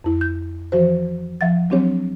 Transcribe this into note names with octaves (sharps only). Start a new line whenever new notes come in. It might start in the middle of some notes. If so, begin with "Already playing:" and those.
F2 E4
G6
E3 F3 F#4 C5
F3 E5 F#5 A6
F#3 C4 D4 G4 C#5